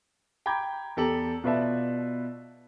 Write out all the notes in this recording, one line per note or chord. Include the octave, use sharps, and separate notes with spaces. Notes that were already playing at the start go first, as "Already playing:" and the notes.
G5 A#5 B5 D6 G6 G#6
E2 G4 A4 A#5 F#7
B2 F4 B4 D5 E5 A5